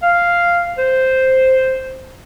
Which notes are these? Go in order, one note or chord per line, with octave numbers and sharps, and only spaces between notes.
F5
C5